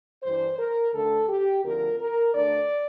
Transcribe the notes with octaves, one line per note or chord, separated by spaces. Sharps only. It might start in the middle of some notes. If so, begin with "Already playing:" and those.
G2 E3 G3 D4 C5
A#4
D2 D3 A3 A4
G4
D2 D3 F3 C4 A#4
A#4
D2 D3 A3 D4 D5